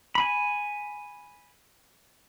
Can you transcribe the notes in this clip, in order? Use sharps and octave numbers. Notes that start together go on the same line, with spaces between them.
G#5 B5